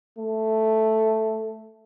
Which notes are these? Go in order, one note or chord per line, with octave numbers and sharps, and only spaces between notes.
A3